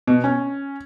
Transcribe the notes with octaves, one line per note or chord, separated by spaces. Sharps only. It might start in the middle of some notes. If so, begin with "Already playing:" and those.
B2
C#4